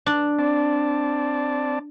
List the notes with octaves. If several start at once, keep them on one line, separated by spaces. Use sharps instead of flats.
D4
C4 D5 A5